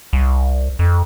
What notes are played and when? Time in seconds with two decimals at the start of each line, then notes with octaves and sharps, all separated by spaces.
0.13 C2
0.79 F2